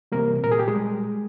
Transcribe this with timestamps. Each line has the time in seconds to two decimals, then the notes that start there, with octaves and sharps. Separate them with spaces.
0.12 C3 E3 G3 A#3 A#4
0.44 A#2 A#4
0.52 G#4
0.59 G4
0.68 G#3 G#4
0.76 G3